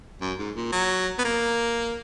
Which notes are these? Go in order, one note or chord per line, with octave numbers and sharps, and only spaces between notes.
F#2
G#2
A#2
F#3
B3
A#3